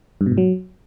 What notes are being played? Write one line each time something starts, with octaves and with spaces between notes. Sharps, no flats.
G2
B2
G#2
F#3